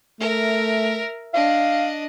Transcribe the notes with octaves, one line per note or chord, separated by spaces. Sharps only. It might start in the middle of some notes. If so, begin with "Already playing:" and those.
A3 A#4 E5
D4 D#5 F5